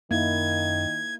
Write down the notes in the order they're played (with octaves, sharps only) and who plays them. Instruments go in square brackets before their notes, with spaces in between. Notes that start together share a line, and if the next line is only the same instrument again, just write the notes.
[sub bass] F#2 [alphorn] D#3 [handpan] A#3 D#4 E4 [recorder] G#6